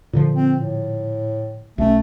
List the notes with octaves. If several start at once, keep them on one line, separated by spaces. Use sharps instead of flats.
A#2 D3 F3
C4
A2
B1 A3 C#4